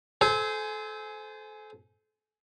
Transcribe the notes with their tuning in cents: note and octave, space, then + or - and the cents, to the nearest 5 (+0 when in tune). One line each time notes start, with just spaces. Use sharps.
A4 -30 C5 -15 G#5 +15